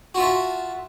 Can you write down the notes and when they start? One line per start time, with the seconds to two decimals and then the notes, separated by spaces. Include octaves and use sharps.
0.15 F#4
0.17 F4
0.20 E5
0.23 A5